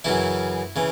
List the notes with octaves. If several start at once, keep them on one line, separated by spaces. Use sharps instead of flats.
F#2 C#3 E3 E4
C#3 E3